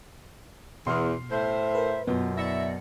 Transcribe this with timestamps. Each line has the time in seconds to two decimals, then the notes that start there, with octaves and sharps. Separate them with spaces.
0.87 E2 B2 C6 F6
1.31 A2 C5 E5
1.75 A#4 B4
2.07 F#2 B2 B3 F4
2.37 E4 D5 E5 A#6 C#7